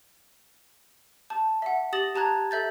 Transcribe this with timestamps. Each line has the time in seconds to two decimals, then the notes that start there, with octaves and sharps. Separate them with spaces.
1.30 A5
1.62 E5 F#5
1.93 G4 D#6 A6 A#6 F#7
2.15 G4 A5 A#5 F#6 G#6
2.51 A4 E5 G6 A6